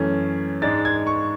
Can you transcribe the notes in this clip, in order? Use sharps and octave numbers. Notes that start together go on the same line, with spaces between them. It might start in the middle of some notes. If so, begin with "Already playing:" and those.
Already playing: F#2 E3 A3 C#4
G#2 G#3 D4 A6
G#6
C#6